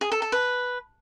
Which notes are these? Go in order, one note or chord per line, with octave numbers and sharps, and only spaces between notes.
G#4
A4
A4
B4